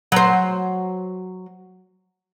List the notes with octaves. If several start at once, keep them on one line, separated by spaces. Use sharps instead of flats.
F#3 C5